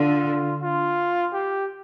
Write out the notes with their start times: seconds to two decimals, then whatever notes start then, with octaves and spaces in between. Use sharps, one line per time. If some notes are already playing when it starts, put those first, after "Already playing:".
Already playing: D3 F4
0.62 F4
1.33 G4